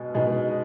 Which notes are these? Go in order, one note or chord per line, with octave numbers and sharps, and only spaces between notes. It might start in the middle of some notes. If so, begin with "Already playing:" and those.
Already playing: B2 G#3
B2 G#3 D#4